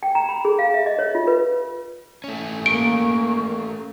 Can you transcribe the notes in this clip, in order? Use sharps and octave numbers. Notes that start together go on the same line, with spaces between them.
G5
A#5
B5
G#4
F5
E5
D#5
C#5
F4
B4
A3 C#4
A#3 C#6 D7